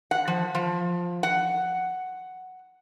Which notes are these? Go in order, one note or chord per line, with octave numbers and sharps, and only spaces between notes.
F#5
F3
F3
F#5